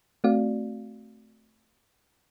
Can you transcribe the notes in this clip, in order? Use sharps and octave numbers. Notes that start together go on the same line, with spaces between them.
A3 C4 F#4 D5 F5